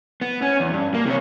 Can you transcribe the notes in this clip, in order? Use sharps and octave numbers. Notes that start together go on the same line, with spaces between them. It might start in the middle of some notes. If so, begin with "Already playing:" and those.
B3
C#4
E2
G2
A#3
C3 C#5